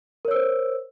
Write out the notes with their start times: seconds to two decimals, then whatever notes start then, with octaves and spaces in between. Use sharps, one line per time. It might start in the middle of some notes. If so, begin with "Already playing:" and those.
0.25 A#4
0.28 C#5
0.31 E6
0.34 C5